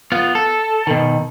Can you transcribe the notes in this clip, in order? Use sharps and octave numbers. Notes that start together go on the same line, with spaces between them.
B3 F4
A4
B2 D#3